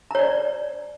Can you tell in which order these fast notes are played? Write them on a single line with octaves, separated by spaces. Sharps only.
A#5 C#5 D5